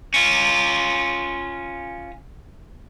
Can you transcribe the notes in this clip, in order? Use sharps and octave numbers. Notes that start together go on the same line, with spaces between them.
C#4 F4